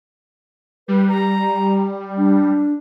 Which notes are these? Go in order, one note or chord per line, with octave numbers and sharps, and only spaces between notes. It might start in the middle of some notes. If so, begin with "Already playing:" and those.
G3 B4
A#5
D4